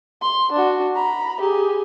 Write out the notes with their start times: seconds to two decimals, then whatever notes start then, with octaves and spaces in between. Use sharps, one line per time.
0.22 C6
0.52 D4 F#4
0.95 A#5 B5
1.40 G4 G#4